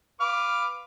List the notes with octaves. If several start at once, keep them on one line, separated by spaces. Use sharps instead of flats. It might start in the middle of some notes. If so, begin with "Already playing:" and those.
B4 F5 D6